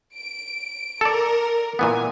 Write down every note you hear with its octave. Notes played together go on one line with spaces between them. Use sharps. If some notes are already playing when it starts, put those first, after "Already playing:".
D7
A4 A#4 D5
A#2 E3 B3 G#5